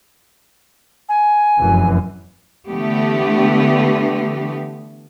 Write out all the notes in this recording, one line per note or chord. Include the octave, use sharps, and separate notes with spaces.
G#5
F1 F#2 E3
D3 E3 A3 B3 G4